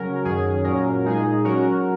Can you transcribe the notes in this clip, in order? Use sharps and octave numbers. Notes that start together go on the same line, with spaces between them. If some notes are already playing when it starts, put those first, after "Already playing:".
Already playing: C#3 F#3 C#4 A#4
F#2 D#3 F#3 C#4 G#4
A#2 F#3 C#4 A#4
A#2 G#3 D#4 G#4
F#3 C#4 F#4 A#4